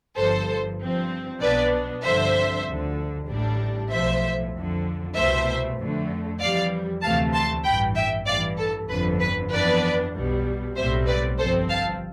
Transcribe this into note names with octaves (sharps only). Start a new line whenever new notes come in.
G1 G2 F3 A4 C5
G2 F3 C4
B1 B2 B3 D4 B4 D5
G2 D3 F3 C4 C5 E5
D2 D3 F3
A1 A2 G3 D4
B1 A2 F3 C5 E5
F2 D3 F3
C2 B2 A3 C5 E5
F2 D3 A3
F2 E3 G3 D5 F5
D2 C3 E3 A3 F5 A5
A5 C6
A1 G2 E3 G5 B5
E5 G5
A1 G2 E3 D5 F5
A4
G1 F2 D3 F3 B4
B4
F2 E3 B3 D4 B4 D5
B1 B2 G3
B1 A2 G3 C4 C5 E5
B4 D5
G1 G2 F3 C4 A4 C5
F5 A5